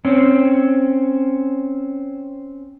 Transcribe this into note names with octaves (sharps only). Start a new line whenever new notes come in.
C4 C#4